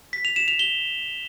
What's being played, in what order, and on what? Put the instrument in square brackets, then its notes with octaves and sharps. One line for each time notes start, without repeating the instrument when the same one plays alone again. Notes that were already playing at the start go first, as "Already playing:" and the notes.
[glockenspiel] B6
F7
E7
F7
G7